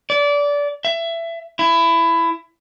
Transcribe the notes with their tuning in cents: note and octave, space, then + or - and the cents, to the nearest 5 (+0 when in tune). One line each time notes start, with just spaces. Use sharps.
D5 -25
E5 +20
E4 +20